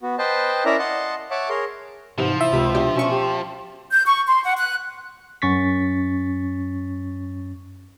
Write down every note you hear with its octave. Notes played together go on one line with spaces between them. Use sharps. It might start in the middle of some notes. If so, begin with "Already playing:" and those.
B3 F#4
B4 C5 D#5 G5 A5
C#4 E4 A#4 D5 E5 A#5
D#5 F#5 A5 C6
C#5 E5 F#5 A5 D6
G#4 A#4 C#5 C6
G#2 C3 E3 F3
E4 E5
C#2 C3 B5
B2 D4 G4
B2 C#4 C#6
G4
G6
C#6
C6
F#5
F#6
F#2 C#4 C#6 A6 B6